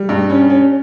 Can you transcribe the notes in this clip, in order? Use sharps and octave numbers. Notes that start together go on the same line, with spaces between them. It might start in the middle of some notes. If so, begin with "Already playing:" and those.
Already playing: G3
G2
C#4
C#4